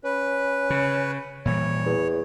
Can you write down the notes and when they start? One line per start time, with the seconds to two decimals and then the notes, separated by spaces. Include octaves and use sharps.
0.04 C#4 B4
0.70 C#3
1.45 A#2 E3 G3 C#5
1.86 E2